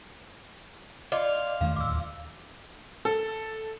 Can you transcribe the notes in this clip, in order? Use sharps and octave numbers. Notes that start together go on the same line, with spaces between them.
F4 D5 D#5 D6
E2 D#3 A3 F5
D1 D#2 D6 E6
A4